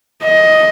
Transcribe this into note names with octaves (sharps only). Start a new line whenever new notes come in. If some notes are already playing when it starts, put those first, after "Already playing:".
D#5